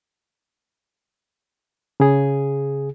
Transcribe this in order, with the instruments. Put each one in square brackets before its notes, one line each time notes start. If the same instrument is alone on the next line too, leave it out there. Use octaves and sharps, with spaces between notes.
[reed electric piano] C#3 G#4